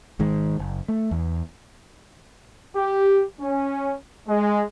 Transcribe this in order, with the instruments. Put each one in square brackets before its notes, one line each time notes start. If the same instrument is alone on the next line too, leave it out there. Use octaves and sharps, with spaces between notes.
[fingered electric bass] G#1 D#3 G#3
F#1
A3
E2
[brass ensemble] G4
C#4
G#3